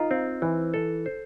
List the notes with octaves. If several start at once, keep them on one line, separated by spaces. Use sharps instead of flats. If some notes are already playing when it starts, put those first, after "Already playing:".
Already playing: D#4 F4
C4
E3
A4
C5